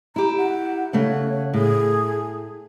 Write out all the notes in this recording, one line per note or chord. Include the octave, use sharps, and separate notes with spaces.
E4 G4 A#5
F#5
C#3 A3 C#5 F#5
A2 G#4